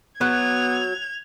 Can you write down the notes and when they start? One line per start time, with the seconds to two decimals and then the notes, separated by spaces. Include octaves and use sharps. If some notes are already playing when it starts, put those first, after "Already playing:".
0.21 F#3 B3 G#6 F7